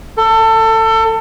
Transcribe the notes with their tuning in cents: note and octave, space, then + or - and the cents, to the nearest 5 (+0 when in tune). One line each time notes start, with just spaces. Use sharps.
A4 +25